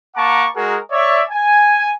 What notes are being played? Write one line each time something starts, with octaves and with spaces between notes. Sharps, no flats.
A#3 F#5 A5 A#5 C#6 D6
G#3 F#4 G#4 A#4
C#5 D5 E5
G#5